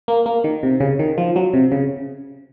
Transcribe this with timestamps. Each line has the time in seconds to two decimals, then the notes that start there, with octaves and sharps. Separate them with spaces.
0.08 A#3
0.26 A#3
0.44 D#3
0.63 C3
0.80 C#3
0.99 D#3
1.18 F3
1.36 F#3
1.54 C3
1.72 C#3